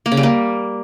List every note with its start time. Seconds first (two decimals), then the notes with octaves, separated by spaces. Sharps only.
0.06 A#3
0.12 C#3
0.17 G3
0.23 A#3